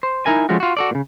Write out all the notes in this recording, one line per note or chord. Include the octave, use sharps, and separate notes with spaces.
C5
D#4 E4 A#4 G#5
F3 G#3 A3 C#4 F#4
F4 F#4
F#4 A4 D5
A#2 C#3